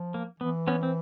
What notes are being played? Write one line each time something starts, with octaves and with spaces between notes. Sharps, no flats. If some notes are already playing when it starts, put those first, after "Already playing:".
Already playing: F3
A#3
E3 B3
B3 C#4
C4